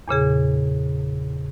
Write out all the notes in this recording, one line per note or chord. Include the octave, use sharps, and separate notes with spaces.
E2 A#2 C#3 G#4